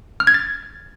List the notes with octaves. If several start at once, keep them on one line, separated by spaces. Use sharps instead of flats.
F6
G#6
A6